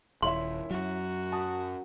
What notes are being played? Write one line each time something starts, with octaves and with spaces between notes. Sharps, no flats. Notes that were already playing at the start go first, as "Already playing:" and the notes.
D#1 E4 C#5 E5 C6
F#2 F#3 F#4
A5 D#6